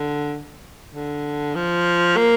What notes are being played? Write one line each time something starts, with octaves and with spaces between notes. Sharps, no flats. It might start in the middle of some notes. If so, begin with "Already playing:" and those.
Already playing: D3
D3
F3
A#3